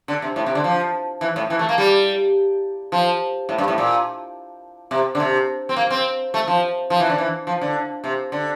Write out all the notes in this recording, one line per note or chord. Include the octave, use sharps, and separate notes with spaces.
D3
C3
A2
C3
D3
F3
E3
A2
E3
A3
A#3
G3
F3
A2
G2
A2
A#2
C3
D3
C3
C4
A#3
C4
A3
F3
F3
E3
D3
E3
F3
D3
C3
D3